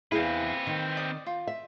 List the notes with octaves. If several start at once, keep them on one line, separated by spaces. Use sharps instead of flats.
E2 C4 E4 G#4 B4 F5
D#3
D5 D#6
F4
E5